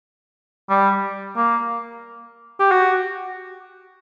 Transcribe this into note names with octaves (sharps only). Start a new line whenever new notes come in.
G3
A#3
G4
F#4